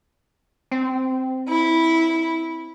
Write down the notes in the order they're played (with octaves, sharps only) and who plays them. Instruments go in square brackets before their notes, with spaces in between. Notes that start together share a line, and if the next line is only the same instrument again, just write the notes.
[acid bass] C4
[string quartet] E4